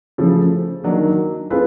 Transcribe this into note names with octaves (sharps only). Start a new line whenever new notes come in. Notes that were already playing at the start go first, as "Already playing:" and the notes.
C#3 F3 A3
D#3 F#3 A#3 D4
A3 C4 F4 G#4 B4